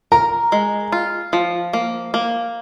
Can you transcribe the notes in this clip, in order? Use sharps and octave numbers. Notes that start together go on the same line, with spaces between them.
A#4 A#5
G#3
F4
F3
A#3
A#3